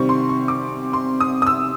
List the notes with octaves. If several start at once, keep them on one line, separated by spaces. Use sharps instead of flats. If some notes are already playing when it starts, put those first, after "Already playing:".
Already playing: C3 D#3 G3 C4 C#6
C6
C#6
D6
C6
D#6
D#6
E6